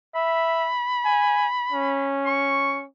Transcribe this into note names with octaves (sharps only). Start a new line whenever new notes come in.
E5 B5
G#5
C#4
C#6